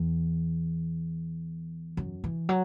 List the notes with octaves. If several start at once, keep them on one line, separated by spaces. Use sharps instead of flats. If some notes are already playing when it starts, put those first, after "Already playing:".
Already playing: E2
F#2
E3
F#3